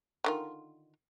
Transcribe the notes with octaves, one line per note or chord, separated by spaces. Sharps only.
D3 D#3 F4